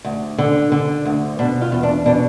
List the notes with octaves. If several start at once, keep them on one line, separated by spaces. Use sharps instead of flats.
D2
D3
D3
D2
B2 D4
F4
E2
D4
B2 D4